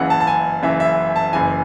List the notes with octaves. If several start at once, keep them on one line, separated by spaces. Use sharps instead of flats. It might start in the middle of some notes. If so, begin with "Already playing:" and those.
Already playing: F#1 F#2 C#3 E3 F#5
A5
A5
G#5
F#1 F#2 C#3 E3 E5
E5
A5
F#1 F#2 E3 G#5